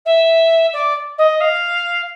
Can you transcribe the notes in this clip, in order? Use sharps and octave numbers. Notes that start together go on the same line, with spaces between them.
E5
D5
D#5
F5